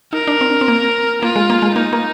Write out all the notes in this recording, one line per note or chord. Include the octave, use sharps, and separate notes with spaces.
D#4 A#4
D4
C4
C4
A#3
A#3 F4
G#3
A#3
G#3
A#3 D#4
A#3